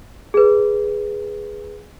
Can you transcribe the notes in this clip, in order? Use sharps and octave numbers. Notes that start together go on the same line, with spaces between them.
G#4 B4